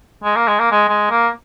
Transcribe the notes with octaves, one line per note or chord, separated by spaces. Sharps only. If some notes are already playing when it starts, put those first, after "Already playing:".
G#3
A#3
G#3
A#3
G#3
G#3
A#3